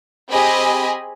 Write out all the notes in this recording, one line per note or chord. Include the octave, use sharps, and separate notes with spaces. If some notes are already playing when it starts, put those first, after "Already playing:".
C4 G4 G#4 D#5 G#5 B5